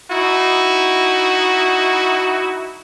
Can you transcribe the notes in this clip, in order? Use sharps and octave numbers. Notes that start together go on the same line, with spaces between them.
D#4 E4 F#4